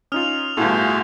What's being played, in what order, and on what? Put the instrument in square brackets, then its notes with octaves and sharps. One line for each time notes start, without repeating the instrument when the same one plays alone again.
[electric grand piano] C#4 D#4 F4 [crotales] D#6 F6 F7
[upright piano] G1 A2 [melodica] F4 F#4 G#4 [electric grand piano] A4